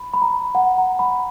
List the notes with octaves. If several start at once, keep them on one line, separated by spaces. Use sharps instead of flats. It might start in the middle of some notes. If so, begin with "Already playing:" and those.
Already playing: B5
B5
A#5
F#5
A#5
B5